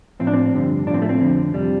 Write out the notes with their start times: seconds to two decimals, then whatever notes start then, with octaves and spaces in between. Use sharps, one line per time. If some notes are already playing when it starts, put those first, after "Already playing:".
0.19 A2 F3 C4
0.27 D4
0.33 C4
0.54 G2 D3 F3
0.87 A2 D4
0.90 F3 C4
1.02 A3
1.09 C4
1.20 F2 D3 F3
1.54 F2 C3 F3 G3